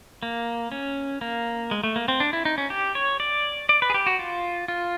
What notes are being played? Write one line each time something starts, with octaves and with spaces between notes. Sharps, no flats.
A#3
C#4
A#3
G#3
A3
A#3
C4
D4
E4
D#4
C#4
G4
C#5
D5
D5
B4
G#4
G4
F#4
F4
F4